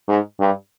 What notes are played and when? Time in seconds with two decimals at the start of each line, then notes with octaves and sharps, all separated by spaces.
0.08 G#2
0.40 G2